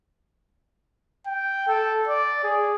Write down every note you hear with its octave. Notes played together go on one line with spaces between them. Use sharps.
G5
A4
D5
G#4